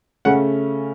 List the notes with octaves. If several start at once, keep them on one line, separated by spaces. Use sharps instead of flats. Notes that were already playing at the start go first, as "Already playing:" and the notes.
C#3 A3 C#4 F#5